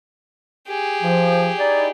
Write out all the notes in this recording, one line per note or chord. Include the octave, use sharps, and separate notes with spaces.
G4 G#4
F3
D#4 E4 D5